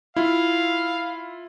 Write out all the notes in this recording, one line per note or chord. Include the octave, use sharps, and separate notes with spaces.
E4 F4 F5